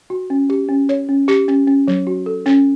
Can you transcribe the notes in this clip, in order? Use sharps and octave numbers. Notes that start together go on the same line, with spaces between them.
F#4
C#4
G4
C#4
C#5
C#4
G4
C#4
C#4
F#3
F#4
A4
C#4